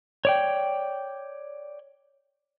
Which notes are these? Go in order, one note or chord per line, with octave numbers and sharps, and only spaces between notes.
C#5 D5 G5